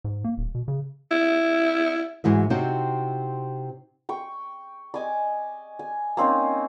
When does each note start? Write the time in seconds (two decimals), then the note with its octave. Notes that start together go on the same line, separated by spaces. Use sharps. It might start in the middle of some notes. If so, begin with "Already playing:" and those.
0.04 G#2
0.24 A#3
0.38 D#1
0.55 B2
0.68 C#3
1.11 E4
2.24 G#2 E3 F#4 E5
2.50 C3 C4 D#4 F#4 E5
4.09 G5 C#6
4.94 D#5 G#5 D6
5.79 G#5
6.17 A#3 C4 C#4 D#4